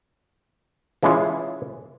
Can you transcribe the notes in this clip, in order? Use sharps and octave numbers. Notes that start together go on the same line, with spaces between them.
E3 G#3 C#4 E4 F4